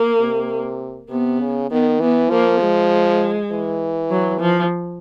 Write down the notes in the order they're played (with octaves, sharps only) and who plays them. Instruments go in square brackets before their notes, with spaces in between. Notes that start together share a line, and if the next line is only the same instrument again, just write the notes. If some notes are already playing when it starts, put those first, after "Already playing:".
Already playing: [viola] A#3
[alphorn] C3
[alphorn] C3 [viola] B3
[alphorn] C#3
[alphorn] D#3 [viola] B3
[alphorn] E3 [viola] B3
[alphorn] F3 [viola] A#3
[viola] G#3
[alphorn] E3
[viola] F#3
F3